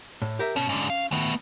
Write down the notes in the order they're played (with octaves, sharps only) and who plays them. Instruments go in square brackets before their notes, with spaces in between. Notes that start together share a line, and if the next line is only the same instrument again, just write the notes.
[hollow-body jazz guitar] A2
G4 A#4 E5
[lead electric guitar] B2 [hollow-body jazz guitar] C#4
[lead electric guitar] G#2 D3
F5
[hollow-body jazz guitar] D#3 [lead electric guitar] A3 B3